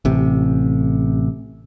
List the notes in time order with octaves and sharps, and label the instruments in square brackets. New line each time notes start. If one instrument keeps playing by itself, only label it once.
[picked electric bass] A1 C3